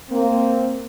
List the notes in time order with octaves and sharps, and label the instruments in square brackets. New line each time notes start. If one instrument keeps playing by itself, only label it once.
[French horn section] A#3 C4